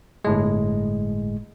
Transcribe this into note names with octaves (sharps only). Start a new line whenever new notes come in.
G1 A2 G#3